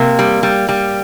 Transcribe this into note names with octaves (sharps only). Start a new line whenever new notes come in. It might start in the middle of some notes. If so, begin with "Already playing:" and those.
Already playing: C3 A#3
G3
G3
G3